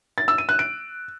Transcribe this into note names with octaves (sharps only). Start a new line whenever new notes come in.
A6
E6
D#7
F#6
D7